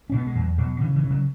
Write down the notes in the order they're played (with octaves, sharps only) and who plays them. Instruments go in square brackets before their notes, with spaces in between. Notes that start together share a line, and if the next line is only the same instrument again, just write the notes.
[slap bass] B2 C#4
B3
G#3
E2 F#3
B2 F#3
C#3 E3
E3
C#3
F#3